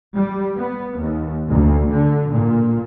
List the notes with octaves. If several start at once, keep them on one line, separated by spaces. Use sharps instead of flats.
G3
B3
D#2
D2
D3
A#2